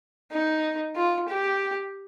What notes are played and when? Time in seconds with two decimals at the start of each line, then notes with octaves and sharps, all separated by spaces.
0.32 D#4
0.96 F4
1.28 G4